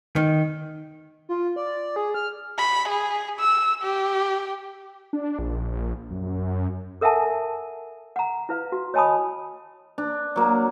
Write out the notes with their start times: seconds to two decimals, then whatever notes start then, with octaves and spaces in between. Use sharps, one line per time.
0.16 D#3
1.29 F4
1.56 D5
1.96 G#4
2.14 F6
2.58 B5
2.88 G#4
3.40 E6
3.82 G4
5.13 D4
5.39 A#1
6.11 F#2
7.01 A4 A#4 E5 F#5 G#5 A5
8.16 F#5 A#5
8.49 E4 B4 F5
8.72 F#4
8.94 C#5 D#5 G#5 A5 B5 D#6
9.98 D4
10.36 F#3 A#3